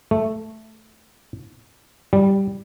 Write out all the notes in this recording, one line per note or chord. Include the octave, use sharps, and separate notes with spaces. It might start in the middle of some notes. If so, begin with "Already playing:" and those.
A3
G3